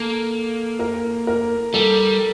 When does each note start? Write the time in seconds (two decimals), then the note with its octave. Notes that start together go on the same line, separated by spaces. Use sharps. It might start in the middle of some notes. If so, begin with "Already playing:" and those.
Already playing: A#3 A4
0.79 A#4
1.27 A#4
1.74 G3 A4